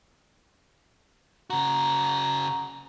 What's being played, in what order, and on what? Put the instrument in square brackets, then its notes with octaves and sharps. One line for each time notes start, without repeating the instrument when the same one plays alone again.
[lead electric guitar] C#3 F#4 [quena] A#5